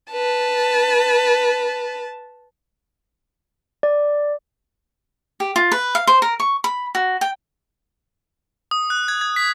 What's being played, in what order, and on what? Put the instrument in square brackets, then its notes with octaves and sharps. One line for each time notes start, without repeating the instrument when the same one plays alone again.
[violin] B4 A5
[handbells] D5
[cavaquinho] G4
F4
B4
F5
C5
A#4
C#6
B5
F#4
G5
[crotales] D#6
F#6
G#6
G#6
B6